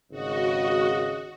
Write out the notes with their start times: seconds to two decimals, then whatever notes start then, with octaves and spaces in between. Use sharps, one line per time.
0.11 G#1 C#3 F#4 D#5